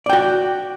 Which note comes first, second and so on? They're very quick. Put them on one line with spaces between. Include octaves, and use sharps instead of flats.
D5 G5 F#4